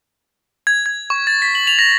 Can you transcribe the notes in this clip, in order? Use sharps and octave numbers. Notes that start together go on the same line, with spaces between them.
G#6
G#6
C#6
A6
B6
F#7
F7
A#6